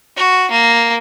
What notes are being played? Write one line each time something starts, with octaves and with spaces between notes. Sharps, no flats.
F#4
A#3